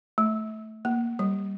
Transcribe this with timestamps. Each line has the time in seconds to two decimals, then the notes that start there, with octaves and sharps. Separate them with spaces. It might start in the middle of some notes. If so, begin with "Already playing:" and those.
0.18 A3
0.85 A#3
1.19 G3